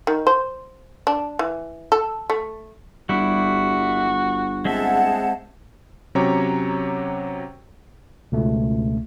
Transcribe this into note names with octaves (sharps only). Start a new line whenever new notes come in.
D#3
C5
D4
E3
A4
A3
G1 G3 E4 F#4
G#3 C4 G#4 E5 F#5 A5
C3 F#3 C#4 G4 C#5 A#5
C#2 B2 A3